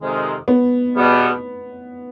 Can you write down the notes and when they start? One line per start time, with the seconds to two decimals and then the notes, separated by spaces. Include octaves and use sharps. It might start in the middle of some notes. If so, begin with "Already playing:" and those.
0.01 F2 C3 D#3 G#3
0.48 B3
0.96 E2 B2 G3 B3